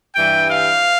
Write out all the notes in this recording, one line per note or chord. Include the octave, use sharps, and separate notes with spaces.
G2 E3 G3 G5
F5